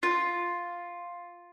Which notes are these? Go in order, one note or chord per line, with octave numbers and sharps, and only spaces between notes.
F4